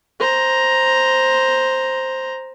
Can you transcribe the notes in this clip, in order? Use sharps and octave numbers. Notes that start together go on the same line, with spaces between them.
C5 A#5